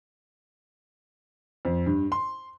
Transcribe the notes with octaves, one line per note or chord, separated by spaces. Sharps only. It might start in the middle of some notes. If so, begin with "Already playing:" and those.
F2
G2
C6